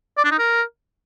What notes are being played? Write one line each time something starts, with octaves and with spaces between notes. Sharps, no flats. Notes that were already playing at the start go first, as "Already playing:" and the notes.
D5
D4
D#4
A#4